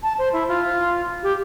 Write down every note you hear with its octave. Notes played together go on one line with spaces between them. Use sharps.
A5
C5
E4
F4
G4